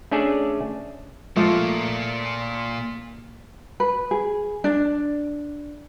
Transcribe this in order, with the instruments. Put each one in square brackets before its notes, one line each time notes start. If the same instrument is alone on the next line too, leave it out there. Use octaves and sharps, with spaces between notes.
[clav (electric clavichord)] A3 C#4 D4 G#4 D5 E5
[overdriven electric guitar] A#2 A#3 [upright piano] F3 A3 F4
[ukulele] B4
G#4
D4